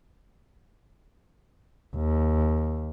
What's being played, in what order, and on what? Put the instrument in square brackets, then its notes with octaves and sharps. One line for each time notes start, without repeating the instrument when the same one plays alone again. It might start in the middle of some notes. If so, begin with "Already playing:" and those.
[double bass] D#2